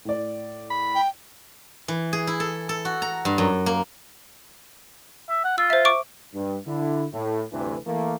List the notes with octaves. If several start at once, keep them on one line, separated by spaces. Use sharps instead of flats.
A2 D5
B5
G5
E3
G#4
E4
A4
A4
F#4
A#5
G2
F#2
A#3
E5
F#5
F4 E6
C5 E5
C#6 D6 D7
G2
D3 E4
A2
D2 G2 C3 E3
E3 A3 A#3